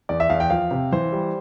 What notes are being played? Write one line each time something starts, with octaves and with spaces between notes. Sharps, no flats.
E2 D5
E5
E2 F5
G5
F3 F5
C3
E3 C5
G3